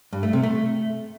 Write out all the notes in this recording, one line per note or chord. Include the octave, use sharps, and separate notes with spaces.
G2
A3
C3
A3